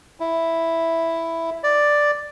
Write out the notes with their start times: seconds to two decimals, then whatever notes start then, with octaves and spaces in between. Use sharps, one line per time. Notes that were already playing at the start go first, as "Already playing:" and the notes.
0.20 E4
1.64 D5